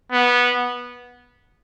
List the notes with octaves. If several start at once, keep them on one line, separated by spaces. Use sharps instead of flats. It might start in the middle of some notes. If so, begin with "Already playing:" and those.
B3